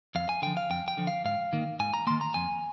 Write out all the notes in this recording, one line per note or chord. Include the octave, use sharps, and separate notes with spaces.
F2 F5
G#5
D3 F3 G5
F5
F2 G5
G5
D3 F3
F5
G#2 F5
D#3 A#3
G#2 G#5
A#5
D#3 A#3 C6
A#5
F2 G#5